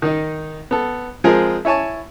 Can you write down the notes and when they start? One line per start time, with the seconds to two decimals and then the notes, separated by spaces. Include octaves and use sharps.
0.02 D#3 D#4
0.71 B3 A4
1.24 F3 G#3 C4 F4 G#4 A#4
1.65 E4 C#5 G#5 A5 C#6